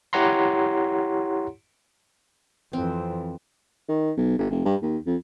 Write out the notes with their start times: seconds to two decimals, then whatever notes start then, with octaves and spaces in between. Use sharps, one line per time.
0.13 E4 G4 C#5 F#5 A#5 C6
2.73 F2 E3 C4
3.89 D#3
4.17 B1
4.38 G1
4.50 F1
4.65 G2
4.82 D#2
5.06 F2